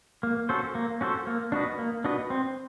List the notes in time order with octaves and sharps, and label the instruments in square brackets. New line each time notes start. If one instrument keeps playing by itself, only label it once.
[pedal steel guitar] A#3
C#4 F#4 A4 C5
A#3
C#4 F#4 A4 C5
A#3
D4 F#4 B4 D#5
A#3
D4 F#4 B4 D#5
C4